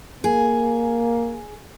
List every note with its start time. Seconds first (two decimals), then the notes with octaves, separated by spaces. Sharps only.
0.24 A#3 G#4